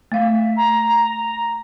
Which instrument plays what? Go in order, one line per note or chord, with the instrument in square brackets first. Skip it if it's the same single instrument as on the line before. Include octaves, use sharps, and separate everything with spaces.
[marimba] A3 F5 [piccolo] E5
[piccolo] A#5